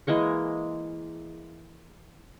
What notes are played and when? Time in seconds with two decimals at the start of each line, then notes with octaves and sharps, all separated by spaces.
0.07 E3 G#3 A#3 C#6